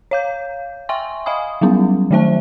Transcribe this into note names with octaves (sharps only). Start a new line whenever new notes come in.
C#5 F5 G6
E5 G5 G#5 C6 C#6
D#5 F5 G#5 B5 D#6
F#3 G3 B3 C#4
D#3 F#3 A3 C5 E5 A5